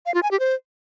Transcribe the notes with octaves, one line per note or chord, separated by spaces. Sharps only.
F5
F4
G#5
G4
C5